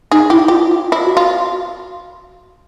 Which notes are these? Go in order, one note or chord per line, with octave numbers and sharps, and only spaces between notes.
D#4 G#4
E4 G4
F4 G4
F4
E4
F#4
F4